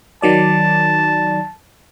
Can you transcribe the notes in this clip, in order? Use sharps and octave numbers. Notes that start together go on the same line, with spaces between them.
D#3 F#3 D5 A5